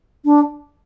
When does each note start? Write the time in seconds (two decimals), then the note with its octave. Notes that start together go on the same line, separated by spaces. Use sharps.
0.25 D4